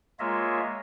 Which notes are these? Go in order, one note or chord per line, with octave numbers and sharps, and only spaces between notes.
G#3 A#3 F4 C#5 D#5 E5